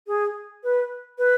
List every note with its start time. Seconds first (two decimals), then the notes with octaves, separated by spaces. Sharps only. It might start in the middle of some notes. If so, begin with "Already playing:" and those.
0.07 G#4
0.64 B4
1.18 B4